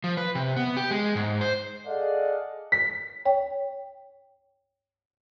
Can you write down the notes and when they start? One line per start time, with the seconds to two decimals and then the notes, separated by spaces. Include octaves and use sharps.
0.04 F3
0.17 B4
0.35 C3
0.56 B3
0.77 G4
0.91 G#3
1.15 G#2
1.41 C5
1.87 G#4 A4 D5 D#5 F5 F#5
2.72 B6
3.25 C#5 G5